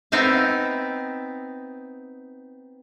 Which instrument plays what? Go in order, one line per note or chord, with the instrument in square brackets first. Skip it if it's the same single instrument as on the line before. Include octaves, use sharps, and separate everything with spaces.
[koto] B3 C4 D#4 E5 F5